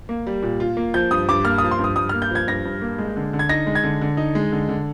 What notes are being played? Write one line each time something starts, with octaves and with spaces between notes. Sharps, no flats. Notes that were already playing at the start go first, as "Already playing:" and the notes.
A#3
G3
A#2
F4
A#3
F3 G6
G2 D#6
G2 D6
A#3 F6
F3 D#6
C6
G2
D#6
G2 D#6
A#3 F6
G6
F3 G#6
G2 A#6
G2
A#3
G#3
D3
D3
G#6
D#4 A#6
G#3
G#6
D3
D3
D#4
G#3
D3
D3